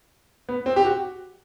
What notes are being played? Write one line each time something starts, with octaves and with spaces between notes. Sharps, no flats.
B3
C4
G4
F#4